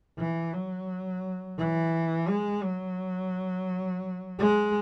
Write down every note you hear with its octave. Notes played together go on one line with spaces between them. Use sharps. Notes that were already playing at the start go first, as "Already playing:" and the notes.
E3
F#3
E3
G#3
F#3
G#3